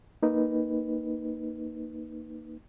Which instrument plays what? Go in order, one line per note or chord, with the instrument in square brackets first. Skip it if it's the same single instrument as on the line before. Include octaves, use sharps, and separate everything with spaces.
[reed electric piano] A#3 D#4 B4